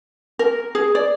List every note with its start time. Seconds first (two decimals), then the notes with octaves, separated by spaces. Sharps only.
0.39 A#4
0.75 G#4
0.95 D5